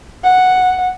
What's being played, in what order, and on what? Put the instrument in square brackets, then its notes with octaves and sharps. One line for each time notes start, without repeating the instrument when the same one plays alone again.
[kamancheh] F#5